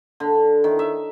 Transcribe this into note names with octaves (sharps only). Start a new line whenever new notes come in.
D3
D#3
E5